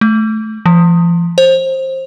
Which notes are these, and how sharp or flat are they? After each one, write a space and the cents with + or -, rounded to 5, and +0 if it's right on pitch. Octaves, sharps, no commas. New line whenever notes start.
A3 -15
F3 -40
C5 +20